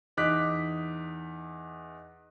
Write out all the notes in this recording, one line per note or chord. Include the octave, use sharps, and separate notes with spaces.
E2 D#4 D6 F#6 B6